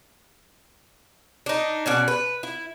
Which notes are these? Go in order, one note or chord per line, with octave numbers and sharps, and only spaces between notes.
D4 D#4
B2 C#4 D5
B4
E4